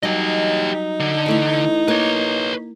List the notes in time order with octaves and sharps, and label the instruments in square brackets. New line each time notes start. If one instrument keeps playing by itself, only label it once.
[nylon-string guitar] F#3 G3 [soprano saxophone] D#4 [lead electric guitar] G4 D#5
[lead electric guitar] D3
[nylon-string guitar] E3 A3 E4
[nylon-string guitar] A#3 A#4 [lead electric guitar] B4 C#5